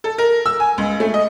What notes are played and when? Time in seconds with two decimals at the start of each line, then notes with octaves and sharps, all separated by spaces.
0.04 A4
0.18 A#4
0.46 E6
0.60 G#5
0.78 C#2
1.00 A3
1.14 D#5